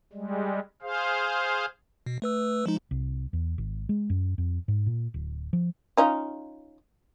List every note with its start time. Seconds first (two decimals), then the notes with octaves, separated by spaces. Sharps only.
0.13 G3 G#3
0.82 G#4 C5 F5
2.06 B2
2.22 A3 B4 E6
2.66 F3 G#3 D#4
2.91 C2
3.33 E2
3.58 G#1
3.89 G#3
4.10 F#2
4.38 F2
4.68 G#2
4.86 A#2
5.14 D1
5.53 F3
5.97 C#4 D#4 F4